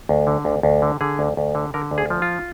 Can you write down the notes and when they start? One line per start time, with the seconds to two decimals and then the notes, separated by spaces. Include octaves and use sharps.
0.09 D2
0.27 D3
0.45 D2
0.63 D2
0.82 D3
1.01 D3 G#4
1.19 D2
1.37 D2
1.55 D3
1.74 D3 A#4
1.91 D2
1.98 G#4
2.10 F3
2.22 F4